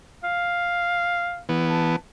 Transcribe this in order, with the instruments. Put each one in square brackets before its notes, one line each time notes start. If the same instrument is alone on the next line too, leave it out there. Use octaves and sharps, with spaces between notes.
[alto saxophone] F5
[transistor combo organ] E3 B3
[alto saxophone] A5